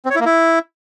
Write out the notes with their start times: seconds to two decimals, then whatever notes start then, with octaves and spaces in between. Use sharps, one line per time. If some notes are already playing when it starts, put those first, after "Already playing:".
0.05 C4
0.10 C#5
0.15 E4
0.20 A#3
0.25 E4